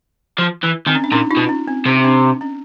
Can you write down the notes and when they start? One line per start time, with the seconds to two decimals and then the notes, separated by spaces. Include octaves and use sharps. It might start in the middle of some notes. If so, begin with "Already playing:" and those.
0.39 F3
0.63 E3
0.87 D#3 C4
0.95 C#4
1.04 D4
1.12 A#2 C#4 D#4
1.31 D#4 F4
1.37 B2
1.49 C#4
1.68 C4
1.86 C3
2.04 C4 D4
2.41 C#4